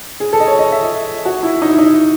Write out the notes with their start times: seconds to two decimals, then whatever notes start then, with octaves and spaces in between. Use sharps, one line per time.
0.20 G#4
0.33 A4
0.40 D#5
0.47 C#5
0.59 D#5
0.72 E5
1.25 F#4
1.43 E4
1.62 D#4
1.71 E4
1.78 D#4